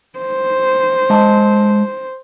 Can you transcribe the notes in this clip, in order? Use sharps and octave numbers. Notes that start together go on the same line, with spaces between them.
C5
G#3 D#5 A5